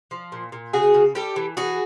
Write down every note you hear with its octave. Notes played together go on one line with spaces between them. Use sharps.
F3
A#2
A#2
C#3 F#4 G#4
C#3
G3 G4 A4
E3
E3 F#4 G#4